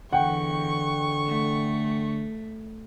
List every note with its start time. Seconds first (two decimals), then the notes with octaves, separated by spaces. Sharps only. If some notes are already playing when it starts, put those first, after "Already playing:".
0.13 E2 D3 F#5 G5 C#6
1.26 A3